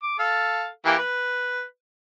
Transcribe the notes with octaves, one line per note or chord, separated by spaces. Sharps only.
D6
A4 F5
E3 A#3 G4
B4